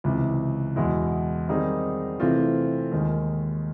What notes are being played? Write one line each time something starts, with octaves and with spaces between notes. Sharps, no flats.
C#2 C3 E3
E2 B2 G#3 B3 E4
D#3 G3 C4 D#4 G#4
C3 E3 A3 C4 F4
D#2 D#3 G#3